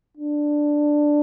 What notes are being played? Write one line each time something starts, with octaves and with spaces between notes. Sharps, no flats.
D4